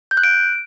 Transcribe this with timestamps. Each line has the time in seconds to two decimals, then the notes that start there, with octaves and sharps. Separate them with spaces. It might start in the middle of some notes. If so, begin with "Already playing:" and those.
0.11 G6
0.17 F#6
0.24 D7